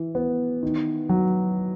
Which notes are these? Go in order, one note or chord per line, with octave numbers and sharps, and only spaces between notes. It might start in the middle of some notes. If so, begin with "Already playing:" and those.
Already playing: E3
B3
D#3
F#3